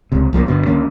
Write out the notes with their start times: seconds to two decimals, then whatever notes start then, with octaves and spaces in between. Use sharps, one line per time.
0.12 C#2 C3
0.33 C2 F3 G#3 A#3
0.46 G1 B2 D3
0.66 D2 D#3 A#3 C#4